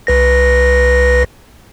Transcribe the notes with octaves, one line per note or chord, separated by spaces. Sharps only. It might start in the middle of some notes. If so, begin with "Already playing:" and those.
C2 B4 A#6